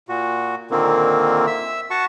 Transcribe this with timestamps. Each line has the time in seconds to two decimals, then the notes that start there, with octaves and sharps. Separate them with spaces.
0.09 A#2 F#4
0.71 A#2 D3 D#3 A#3 C4
1.47 E5 E6
1.90 F#4 F#5 A5 C#6